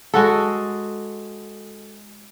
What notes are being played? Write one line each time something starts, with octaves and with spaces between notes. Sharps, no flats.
G#3 F#4 A4